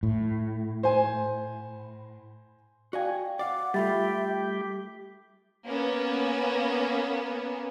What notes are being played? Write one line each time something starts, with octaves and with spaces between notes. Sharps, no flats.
A2
C5 G#5
F#4 D5 D#5 F5 G5 G#5
D5 F5 F#5 D6
G3 A3 F4 G4 E5 B5 A6
A#3 B3 C#4